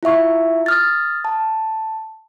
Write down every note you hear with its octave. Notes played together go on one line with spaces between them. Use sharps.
E4 F4 E5 C#6
D#6 F6 A6
A5